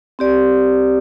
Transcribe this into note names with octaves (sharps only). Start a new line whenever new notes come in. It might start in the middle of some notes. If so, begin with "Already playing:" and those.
C4 G4 D5